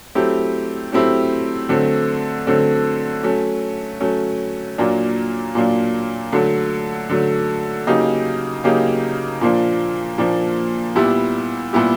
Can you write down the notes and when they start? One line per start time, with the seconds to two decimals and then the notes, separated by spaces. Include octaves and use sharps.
0.15 F#3 A3 C4 E4 G4
0.92 F#3 A3 C4 E4 G4
1.69 D3 F#3 A3 C4
2.47 D3 F#3 A3 C4
3.23 F#3 A3 C#4
4.01 F#3 A3 C#4
4.78 A#2 F#3 A#3 D4
5.55 A#2 F#3 A#3 D4
6.32 D3 F#3 A3
7.09 D3 F#3 A3
7.87 C#3 F#3 A#3 D#4 G4
8.64 C#3 F#3 A#3 D#4 G4
9.41 A#2 F3 A#3 D4
10.18 A#2 F3 A#3 D4
10.95 A#2 G3 B3 E4 G4
11.73 A#2 G3 B3 E4 G4